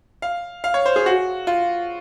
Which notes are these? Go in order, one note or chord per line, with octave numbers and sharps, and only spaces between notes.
F5
F5
C#5
C5
G#4
F#4
F4